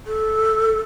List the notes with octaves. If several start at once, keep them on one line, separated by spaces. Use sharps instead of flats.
A4